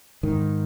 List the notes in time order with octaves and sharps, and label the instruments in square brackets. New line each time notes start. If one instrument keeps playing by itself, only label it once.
[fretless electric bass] G#2 D#3